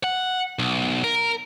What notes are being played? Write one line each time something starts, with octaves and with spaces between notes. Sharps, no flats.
F#5
B1
A#4